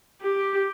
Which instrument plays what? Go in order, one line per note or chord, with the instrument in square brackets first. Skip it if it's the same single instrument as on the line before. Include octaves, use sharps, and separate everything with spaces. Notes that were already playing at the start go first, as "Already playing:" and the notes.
[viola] G4